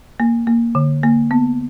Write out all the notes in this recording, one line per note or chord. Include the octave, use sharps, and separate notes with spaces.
A#3
A#3
D3
A#3
B3